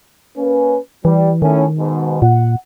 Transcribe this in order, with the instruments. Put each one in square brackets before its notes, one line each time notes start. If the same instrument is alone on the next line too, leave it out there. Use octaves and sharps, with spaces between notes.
[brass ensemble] A#3 C#4 B4
[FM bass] E3 [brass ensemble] G3
[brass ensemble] A2 C#4 [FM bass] D#3
[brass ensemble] G#2 B2
[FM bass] A#2 [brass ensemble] F#5